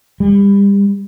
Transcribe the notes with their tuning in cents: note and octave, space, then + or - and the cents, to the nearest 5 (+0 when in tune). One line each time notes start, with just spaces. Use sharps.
G3 +30